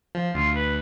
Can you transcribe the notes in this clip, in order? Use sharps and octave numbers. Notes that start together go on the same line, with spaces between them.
F3
D2 F4
B4